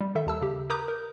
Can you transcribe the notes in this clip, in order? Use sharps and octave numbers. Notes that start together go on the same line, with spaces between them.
G3
D#3 A4 E5
D#2 A5 E6
C#3 G4
A#4 B4 A#5 D6 D#6 G6
A#4